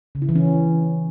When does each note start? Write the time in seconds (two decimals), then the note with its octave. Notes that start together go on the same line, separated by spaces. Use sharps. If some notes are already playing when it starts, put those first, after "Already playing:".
0.15 C#3
0.22 E4
0.29 E3
0.36 C#4